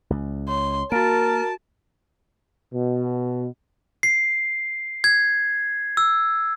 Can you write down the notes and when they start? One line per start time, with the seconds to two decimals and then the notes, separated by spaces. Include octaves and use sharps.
0.10 C#2
0.49 C#5 C6
0.92 A#3 F#4 A#4 A5 A6 D7
2.73 B2
4.03 C7
5.04 G#6
5.97 E6